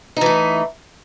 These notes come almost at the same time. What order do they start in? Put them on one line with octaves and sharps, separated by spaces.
D#4 E3 A3